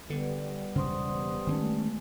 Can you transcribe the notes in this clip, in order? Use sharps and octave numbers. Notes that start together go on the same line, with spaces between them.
D3 G3 B3
E1 C#3 C5 C6 D#6
D#3 G#3 A3 C4 C#4